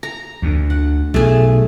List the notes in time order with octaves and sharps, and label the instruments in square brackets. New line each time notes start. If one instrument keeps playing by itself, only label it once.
[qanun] A#5
[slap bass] D2
[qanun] F#5
[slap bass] B1 [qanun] A3 G#4